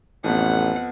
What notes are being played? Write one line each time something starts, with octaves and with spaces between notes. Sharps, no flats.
A1 F2 B3 F#5